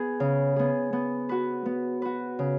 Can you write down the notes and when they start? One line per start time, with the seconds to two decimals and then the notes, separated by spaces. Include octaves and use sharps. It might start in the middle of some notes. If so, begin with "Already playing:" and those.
Already playing: B3 G#4
0.20 C#3
0.56 B3 G#4
0.93 B3
1.29 F#4 B4
1.66 B3
2.02 F#4 B4
2.39 C#3